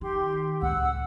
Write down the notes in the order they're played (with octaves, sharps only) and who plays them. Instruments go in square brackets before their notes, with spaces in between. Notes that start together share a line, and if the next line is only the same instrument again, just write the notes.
[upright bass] D#3 [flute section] G4 C6
[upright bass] C#2 A2 [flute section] F#5 E6